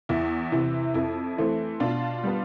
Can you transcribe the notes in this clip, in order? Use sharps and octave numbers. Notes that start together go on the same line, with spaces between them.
E2 E4
C3 E3
F2 E4
E3 A3 C4
B2 D4 F4
G3 B3